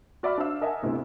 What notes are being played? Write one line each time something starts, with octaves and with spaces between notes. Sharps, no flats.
F#4 D5 E5 B5 D6 F6
D4 C5 E5 F5 E6
A#4 D#5 E5 F#5 G#5 A5
G1 D2 C3 B3 E4